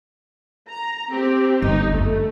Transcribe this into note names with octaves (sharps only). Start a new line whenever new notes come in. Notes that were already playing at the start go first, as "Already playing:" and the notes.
A#5
C4 G4
G1 D#4
F#2 A3